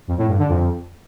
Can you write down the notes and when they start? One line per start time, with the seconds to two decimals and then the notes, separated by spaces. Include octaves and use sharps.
0.08 F2
0.18 A2
0.28 G2
0.39 D3
0.49 F2